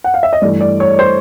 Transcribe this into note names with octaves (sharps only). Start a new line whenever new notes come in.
F#5
F5
E5
D#5
G2 E3 A3 D5
D5
C#5
C5